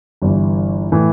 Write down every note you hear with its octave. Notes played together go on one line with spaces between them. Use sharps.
G1 G2 E3
A2 E3